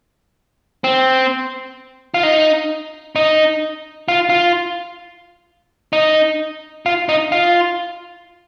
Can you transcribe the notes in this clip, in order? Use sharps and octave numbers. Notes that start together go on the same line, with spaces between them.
C4
F4
D#4
D#4
F4
F4
D#4
F4
D#4
F4